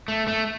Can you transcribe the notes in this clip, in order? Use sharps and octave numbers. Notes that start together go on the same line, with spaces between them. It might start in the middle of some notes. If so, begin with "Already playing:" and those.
A3
A3